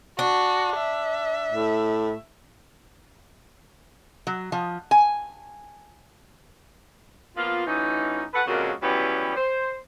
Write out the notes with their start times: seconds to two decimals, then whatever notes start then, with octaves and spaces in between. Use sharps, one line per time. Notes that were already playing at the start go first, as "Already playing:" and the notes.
0.19 D4 F#4
0.77 E5
1.51 A2
4.27 F#3
4.52 F3
4.91 G#5
7.37 F3 A#3 B3 F4
7.66 D2 E3 C#4 D#4
8.33 A4 B4 F#5
8.47 F2 A#2 C#3 G#3 A#3 F#4
8.82 E3 F#3 G3 B3 C#4 G4
9.36 C5